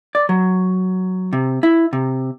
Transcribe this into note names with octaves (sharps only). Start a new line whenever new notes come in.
D5
F#3
C3
E4
C3